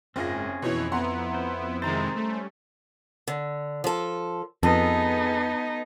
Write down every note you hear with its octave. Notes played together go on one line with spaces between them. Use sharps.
F#1 G#2 C4 C#4 F4 G#4 A#6
F2 B2 E3 E4 C#5
B3 F#5 A#5 C6
C5
C3 D#3 G#3 C5 A#5 A6
G3 A3 C#4
D3
F3 A4
F2 B3 D#4 G#4 A4 B4